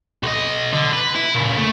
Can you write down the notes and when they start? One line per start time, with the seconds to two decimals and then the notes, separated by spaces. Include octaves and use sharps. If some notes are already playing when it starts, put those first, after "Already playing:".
0.23 B1 D#5
0.73 D3
0.93 B4
1.16 E4
1.35 A#2 C#3
1.58 A3